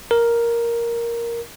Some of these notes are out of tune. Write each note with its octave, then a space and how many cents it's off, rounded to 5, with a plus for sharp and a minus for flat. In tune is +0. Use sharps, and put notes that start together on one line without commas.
A#4 +5